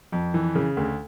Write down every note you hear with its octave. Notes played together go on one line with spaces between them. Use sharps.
F2
E3
C#3
D2